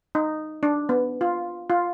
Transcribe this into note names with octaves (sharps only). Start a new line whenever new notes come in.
D#4
D4
B3
F4
F4